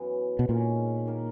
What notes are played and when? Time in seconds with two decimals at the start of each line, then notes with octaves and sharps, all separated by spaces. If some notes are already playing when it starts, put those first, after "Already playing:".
Already playing: F#2 E3 B3
0.39 B2
0.48 A#2 D#3 G#3 C#4
1.06 D#3 A#3 D#4 A#4